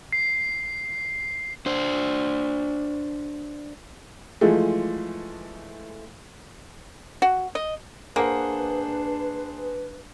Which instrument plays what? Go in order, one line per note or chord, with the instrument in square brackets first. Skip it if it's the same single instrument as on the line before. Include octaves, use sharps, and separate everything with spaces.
[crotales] C7
[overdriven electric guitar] D4 C5
[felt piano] E3 F3 G#3 A3
[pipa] F#4
D#5
[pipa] A#3 [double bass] D4 [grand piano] G#4 C5 F#5 [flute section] B4